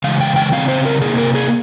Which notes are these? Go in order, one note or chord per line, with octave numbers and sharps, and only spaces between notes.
C#3 E3 G#3 F5
G5
G5
C#3 F3 C4 F5
C5
A#4
C3 F3 A#3 G#4
A#4
G#4